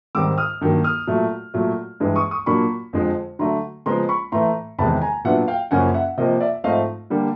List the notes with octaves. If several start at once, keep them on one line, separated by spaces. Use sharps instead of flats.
G#2 D#3 G3 C4 D6 E6
D#6 F6
G2 D#3 F#3 A#3
D#6 F6
A#2 F#3 A3
A#2 F#3 A3
G2 E3 G#3
C#6 D#6
C#6 D#6
A#2 F#3 A#3 D4 B5 C#6
F2 D3 F3 G#3
D3 F#3 A3 D4 A#5 C6
C#3 F3 G#3 B3 A#5 C6
B5 C#6
A2 E3 A3 A#5 C6
E2 C3 D#3 G#3 A5 B5
G#5 A#5
A#2 F#3 B3 D4 E5 F#5
F5 G5
F#2 C#3 F3 A#3 C#4 F#5 G#5
E5 F#5
C3 F3 A#3 D#5
D5 E5
G#2 F3 A3 C4 D#5 F5
D3 G3 A#3